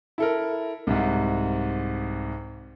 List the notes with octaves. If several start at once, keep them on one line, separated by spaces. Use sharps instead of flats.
E4 A4 A#4
C2 G#2